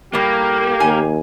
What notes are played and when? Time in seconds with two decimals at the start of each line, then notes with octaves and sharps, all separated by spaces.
0.13 A2 G3 A#3 G4
0.80 D#2 G#5